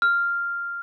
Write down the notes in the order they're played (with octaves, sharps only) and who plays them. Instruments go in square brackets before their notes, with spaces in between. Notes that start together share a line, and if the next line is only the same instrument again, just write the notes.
[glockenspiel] F6